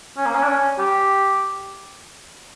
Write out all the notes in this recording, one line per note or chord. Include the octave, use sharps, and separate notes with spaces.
C#4
A#3
C#4
D4
C#4
G4